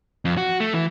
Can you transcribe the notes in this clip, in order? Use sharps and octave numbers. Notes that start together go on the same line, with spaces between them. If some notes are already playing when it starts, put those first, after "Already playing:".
F2
F#4
A3
E3